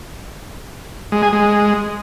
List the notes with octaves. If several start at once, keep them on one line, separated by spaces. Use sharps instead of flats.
G#3
G#4
G#3